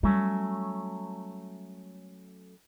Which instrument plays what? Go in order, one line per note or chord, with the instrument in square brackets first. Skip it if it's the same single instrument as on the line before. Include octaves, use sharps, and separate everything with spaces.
[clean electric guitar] F#3 A3 C#4 [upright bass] G3